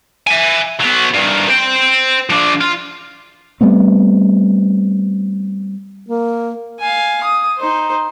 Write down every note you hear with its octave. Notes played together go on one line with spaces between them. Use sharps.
E5 G#5
F#3 B3
G2 D#3
C5 G5
F3 D4
F4
G3 A3 B3 C4
A#3
F5 G#5
D#6
D#4 C5